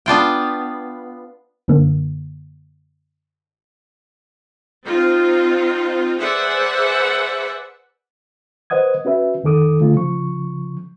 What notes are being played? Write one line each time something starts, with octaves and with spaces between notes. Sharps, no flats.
B3 D4 F4 G5
F#2 D3 A#3
C4 D#4 F4
G#4 B4 C5 D5 E5 F#5
B4 C5 D#5 F#5 D#6 G#6
C#4 F#4 B4 E5
F2 D#3 A4 D6 D#6
D3 A3 F4
C#3 F3 C#6